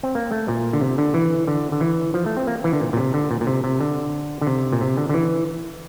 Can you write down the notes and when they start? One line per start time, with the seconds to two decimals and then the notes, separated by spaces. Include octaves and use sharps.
0.03 C4
0.15 A#3
0.32 A3
0.48 A#2
0.73 D3
0.81 C3
0.98 D3
1.14 E3
1.47 D3
1.72 D3
1.81 E3
2.14 F3
2.26 A3
2.37 C4
2.47 A#3
2.64 E3
2.73 D3
2.81 A#2
2.93 A#2
2.97 C3
3.14 D3
3.31 A#2
3.41 A#2
3.47 C3
3.64 C3
3.81 D3
4.41 D3
4.47 C3
4.72 A#2
4.81 C3
4.97 D3
5.09 D3
5.14 E3